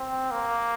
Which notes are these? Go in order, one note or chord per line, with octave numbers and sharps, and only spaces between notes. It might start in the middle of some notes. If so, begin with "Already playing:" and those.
Already playing: C4
A#3